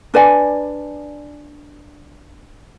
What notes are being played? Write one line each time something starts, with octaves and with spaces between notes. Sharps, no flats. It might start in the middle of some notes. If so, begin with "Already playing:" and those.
D4 B4 D5 G#5